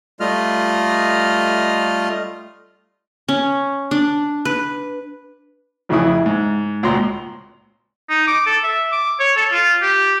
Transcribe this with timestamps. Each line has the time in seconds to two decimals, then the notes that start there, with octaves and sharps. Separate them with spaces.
0.20 G3 A3 F4 D#5 F6
3.29 C#4
3.91 D4
4.45 B4
5.89 A1 F2 C#3 E3 E4 D#6
6.26 G#2
6.83 G#1 C#2 A#2 A#5 C6
8.10 D#4
8.27 D6
8.46 A4
8.64 E5
8.92 D6
9.20 C#5
9.36 A4
9.52 F4
9.82 G4